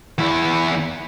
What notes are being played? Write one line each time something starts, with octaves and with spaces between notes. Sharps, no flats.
E2 E4